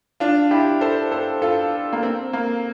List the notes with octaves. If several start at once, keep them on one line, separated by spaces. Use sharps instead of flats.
D4 F4
E4 G4
A4 C5
A4 C5
F4 A4
A#3
C4
A#3